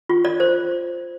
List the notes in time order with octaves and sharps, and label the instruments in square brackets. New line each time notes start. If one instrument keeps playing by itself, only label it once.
[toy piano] F4
D5
C5